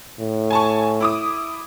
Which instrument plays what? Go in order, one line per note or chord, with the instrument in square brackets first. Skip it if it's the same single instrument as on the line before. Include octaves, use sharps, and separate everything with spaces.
[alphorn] A2
[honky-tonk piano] G#5 A5 C#6
E4 D6 D#6